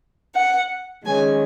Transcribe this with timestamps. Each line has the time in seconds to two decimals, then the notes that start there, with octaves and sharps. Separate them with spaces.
0.35 F#5
1.06 D#3 G#3 C#4 G#5